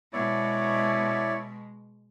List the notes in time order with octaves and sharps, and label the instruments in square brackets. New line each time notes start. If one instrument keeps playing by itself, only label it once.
[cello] B2 G#3 [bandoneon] E4 C#5 D5